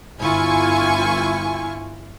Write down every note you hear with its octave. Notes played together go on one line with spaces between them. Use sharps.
G1 E4 F4 G#5 C#6